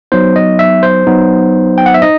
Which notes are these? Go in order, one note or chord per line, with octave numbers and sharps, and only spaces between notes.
F#3 B3 D#4 C5
D#5
E5
C5
F#3 B3 D#4
G5
F#5
E5
D#4 D#5